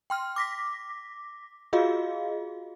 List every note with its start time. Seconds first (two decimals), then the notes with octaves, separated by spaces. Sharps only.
0.10 G5 C6 F6
0.36 D6 A#6 B6
1.73 F4 F#4 G#4 D#5 F5